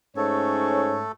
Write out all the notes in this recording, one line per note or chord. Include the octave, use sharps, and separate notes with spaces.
G#2 A3 C#4 A4 C#5